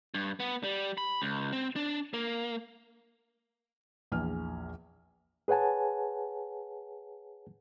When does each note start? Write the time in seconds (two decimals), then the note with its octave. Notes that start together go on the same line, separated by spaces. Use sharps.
0.14 G2
0.40 B3
0.64 G3
0.98 B5
1.22 C#2
1.53 C4
1.76 D4
2.14 A#3
4.12 A#1 E2 G#5 F6
5.48 G#4 B4 C#5 F#5 G#5 A5